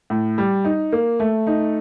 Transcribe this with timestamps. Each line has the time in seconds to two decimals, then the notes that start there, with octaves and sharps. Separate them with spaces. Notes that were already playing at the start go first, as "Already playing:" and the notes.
0.10 A2
0.38 G3
0.65 D#4
0.92 A#3
1.20 A3
1.47 D#4